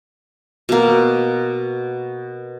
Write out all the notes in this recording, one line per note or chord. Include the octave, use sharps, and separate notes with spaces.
B2 A#3